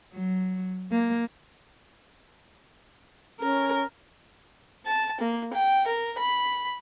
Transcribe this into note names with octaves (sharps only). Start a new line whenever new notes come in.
F#3
A#3
C#4 A#4
A5
A#3
G5
A#4
B5